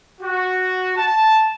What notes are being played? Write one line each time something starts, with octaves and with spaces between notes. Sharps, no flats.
F#4
A5